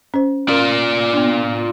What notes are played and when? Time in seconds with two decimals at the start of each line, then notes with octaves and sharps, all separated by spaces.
0.14 C#4 C5
0.49 C#4 F4 A#4 D5
1.13 B3 D4